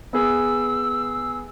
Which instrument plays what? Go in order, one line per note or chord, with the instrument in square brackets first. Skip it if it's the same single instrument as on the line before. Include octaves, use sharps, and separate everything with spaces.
[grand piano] B3 G#4 [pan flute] E6